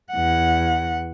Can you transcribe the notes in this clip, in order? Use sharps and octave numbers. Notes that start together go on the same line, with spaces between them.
E2 F#5